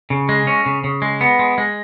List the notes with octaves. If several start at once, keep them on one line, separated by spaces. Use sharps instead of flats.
C#3
G#3
C#4
C#3
C#3
G#3
B3
G#3
G#3